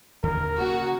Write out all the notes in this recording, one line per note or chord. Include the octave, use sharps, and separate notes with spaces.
D#2 D3 D#3 A#4
C#3 A#3 F#4